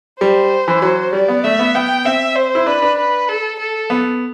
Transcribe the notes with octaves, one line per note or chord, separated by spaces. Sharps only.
G3 C5
E3
F#3
G3 D5
B3
A3 E5
B3
B3 G5
C4 E5
C5
E4
D4 B4
D4
B4
A4
A4
B3